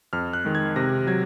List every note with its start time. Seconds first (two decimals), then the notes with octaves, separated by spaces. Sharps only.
0.13 F2 F6
0.33 F#6
0.45 D#3 G#3
0.55 G#6
0.76 C3 A#6
1.07 F#3 G#6